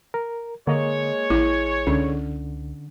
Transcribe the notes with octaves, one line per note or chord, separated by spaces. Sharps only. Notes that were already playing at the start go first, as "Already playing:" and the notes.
A#4
D3 G#3 A#3 C#5 D#5
A1 E4
C#2 D3 C#4